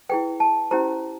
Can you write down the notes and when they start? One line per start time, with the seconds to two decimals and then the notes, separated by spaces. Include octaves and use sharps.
0.09 E4 G#4 B4 G5
0.40 A5
0.71 C#4 E4 G4 C5 A#5